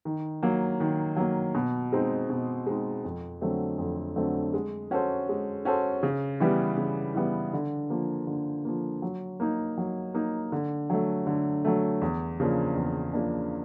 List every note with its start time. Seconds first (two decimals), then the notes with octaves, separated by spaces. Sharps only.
0.05 D#3
0.43 F#3 A#3
0.80 D#3
1.17 F#3 A#3
1.54 B2
1.93 G#3 C4 D#4
2.30 B2
2.66 G#3 C4 D#4
3.05 F2
3.41 D3 F#3 A3 C4
3.78 F2
4.16 D3 F#3 A3 C4
4.54 G#3
4.91 C#4 F#4 A4 C5
5.29 G#3
5.65 C#4 F#4 A4 C5
6.03 C#3
6.40 E3 G3 B3
6.77 C#3
7.15 E3 G3 B3
7.53 D3
7.90 F3 A#3
8.27 D3
8.65 F3 A#3
9.02 F#3
9.40 A#3 D#4
9.78 F#3
10.14 A#3 D#4
10.52 D3
10.90 F#3 A3
11.27 D3
11.65 F#3 A3
12.02 E2
12.40 C#3 F3 A#3 D4
12.76 E2
13.13 C#3 F3 A#3 D4